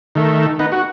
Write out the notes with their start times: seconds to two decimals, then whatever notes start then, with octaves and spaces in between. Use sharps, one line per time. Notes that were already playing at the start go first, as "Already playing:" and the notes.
0.15 D#3 A3
0.59 B3 D#4
0.72 F#4